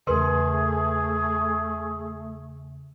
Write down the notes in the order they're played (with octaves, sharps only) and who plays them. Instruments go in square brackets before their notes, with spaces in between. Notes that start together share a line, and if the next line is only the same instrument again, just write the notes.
[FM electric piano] E2 C#3 [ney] A3 [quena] G#4 [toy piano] A#4 B4 C6